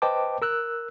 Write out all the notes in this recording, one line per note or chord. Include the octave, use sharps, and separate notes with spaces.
B4 C5 D#5 G5 A5 D6
A#4 E6 F#6